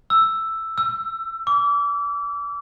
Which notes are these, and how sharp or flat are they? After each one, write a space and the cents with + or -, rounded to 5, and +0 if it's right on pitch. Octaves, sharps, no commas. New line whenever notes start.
E6 +5
E6 +25
D6 -30